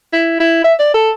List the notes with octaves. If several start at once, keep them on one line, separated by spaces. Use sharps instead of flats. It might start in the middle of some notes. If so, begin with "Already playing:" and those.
E4
E4
E5
D5
A4